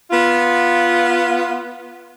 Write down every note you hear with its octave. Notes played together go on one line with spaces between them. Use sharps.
B3 F4